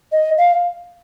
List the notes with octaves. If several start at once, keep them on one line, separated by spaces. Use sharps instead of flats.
D#5
F5